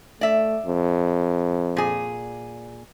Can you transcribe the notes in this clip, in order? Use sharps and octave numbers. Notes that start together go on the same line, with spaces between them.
A3 D5 E5
F2
A#2 G#4